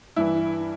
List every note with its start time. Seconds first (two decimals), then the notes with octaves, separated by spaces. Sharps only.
0.16 G2 E3 E4